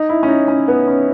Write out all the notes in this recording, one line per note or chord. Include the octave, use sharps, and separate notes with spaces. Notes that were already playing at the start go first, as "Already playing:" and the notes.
Already playing: D#4
E4
C#4
D#4
C#4
B3
C#4